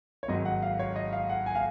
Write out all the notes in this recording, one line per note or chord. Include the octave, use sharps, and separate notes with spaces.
C#5
G#1 G#2 F#3 D#5
F#5
F5
C#5
D#5
F5
F#5
G#5
F5